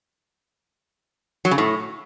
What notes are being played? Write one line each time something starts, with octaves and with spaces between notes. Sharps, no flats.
F#3
C#3
A2